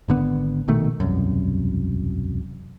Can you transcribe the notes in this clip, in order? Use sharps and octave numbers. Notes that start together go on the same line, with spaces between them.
G#1 D3 B3
A#1 B2 D#3 A3
E1 C2 F#2